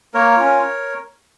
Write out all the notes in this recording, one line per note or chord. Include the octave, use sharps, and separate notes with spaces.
A#3 A#4 C#5
C#4 F4